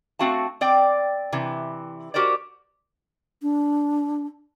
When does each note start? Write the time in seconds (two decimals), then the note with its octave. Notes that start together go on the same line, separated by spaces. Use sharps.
0.19 A3 C4 F#4 F5 A5
0.61 C4 D5 G5
1.33 C3 E3
2.14 F#4 G4 A#4 C5 D5
3.42 D4